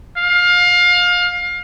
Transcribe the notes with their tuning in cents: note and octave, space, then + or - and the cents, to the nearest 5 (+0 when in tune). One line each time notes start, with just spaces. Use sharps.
F5 +25